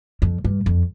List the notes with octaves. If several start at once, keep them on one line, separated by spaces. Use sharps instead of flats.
F2
G2
F2